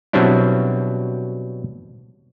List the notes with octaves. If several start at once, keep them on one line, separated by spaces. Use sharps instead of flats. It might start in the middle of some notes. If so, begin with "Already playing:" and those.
B2 F#3 G3 C4 D4 E4